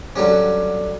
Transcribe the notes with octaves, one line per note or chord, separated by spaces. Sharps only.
D3 F#3 G3 C#4